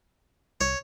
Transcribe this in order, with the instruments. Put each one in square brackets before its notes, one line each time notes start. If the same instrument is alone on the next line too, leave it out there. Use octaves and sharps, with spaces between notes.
[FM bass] C2 [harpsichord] C#5